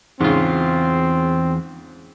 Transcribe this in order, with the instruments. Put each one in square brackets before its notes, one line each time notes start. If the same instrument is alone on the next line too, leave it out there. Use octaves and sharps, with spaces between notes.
[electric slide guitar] E2 F4 [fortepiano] G#2 C#3 [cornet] C4